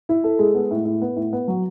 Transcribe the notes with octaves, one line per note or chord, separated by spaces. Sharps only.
E4
A4
G#3
B3
A2
A2
B3
A2
B3
F#3